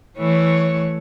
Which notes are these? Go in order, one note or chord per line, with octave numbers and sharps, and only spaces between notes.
E3 A3 C#5